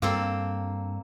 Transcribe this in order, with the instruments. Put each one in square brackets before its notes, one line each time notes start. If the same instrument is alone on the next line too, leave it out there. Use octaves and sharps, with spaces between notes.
[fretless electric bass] G2 [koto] A#3 C4 A4